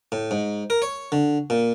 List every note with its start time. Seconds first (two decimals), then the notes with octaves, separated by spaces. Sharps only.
0.12 A2
0.31 G#2
0.70 A#4
0.82 C#5
1.12 D3
1.50 A#2